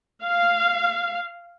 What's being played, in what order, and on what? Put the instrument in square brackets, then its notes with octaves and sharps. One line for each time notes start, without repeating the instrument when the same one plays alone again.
[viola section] F5